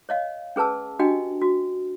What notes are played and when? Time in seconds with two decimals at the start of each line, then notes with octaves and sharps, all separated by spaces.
0.09 C#5 D#5 F5
0.56 C#4 G#4 B4 A5 E6
0.99 D4 F#4 G4 D#5 G5
1.41 F#4